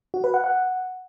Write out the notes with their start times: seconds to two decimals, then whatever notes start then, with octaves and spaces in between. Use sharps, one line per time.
0.14 F#4
0.24 B4
0.34 F#5
0.44 F#5